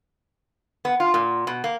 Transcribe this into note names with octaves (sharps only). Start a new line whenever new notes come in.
B3
F4
A#2
B2
A#3